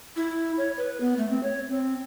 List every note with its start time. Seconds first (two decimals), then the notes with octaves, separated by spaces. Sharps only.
0.16 E4
0.58 C#5
0.78 B4
1.00 B3
1.18 A3
1.30 C4
1.43 C#5
1.68 C4